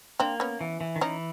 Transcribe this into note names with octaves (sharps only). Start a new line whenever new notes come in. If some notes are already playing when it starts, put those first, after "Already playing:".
A#3 C4 D4
B3 C#4
E3
E3
D#3
E3 C#4 D#4